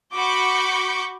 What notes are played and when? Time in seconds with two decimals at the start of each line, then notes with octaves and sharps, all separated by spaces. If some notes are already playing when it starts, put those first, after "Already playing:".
0.15 F#4 B5 C#6 D6 G6 C#7